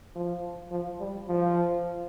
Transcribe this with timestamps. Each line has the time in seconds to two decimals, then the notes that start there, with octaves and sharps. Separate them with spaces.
0.16 F3
0.71 F3
1.00 G3
1.28 F3